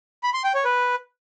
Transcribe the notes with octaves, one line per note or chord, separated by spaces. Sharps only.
B5
C6
G5
C#5
B4